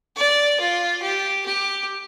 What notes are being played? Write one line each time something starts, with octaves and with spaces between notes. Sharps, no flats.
D5
F4
G4
G4